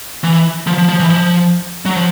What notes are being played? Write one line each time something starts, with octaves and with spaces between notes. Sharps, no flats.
E3
F3
F3
F3
E3
F3
F#3
F3